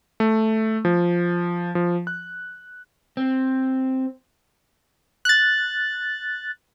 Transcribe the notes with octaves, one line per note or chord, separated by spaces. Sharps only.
A3
F3
F3
F#6
C4
F#6 A6